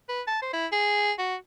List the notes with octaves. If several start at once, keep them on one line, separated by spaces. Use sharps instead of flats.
B4
A5
C5
E4
G#4
F#4